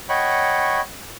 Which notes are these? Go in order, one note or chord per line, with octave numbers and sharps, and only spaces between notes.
C#5 D#5 F#5 G5 B5 C#6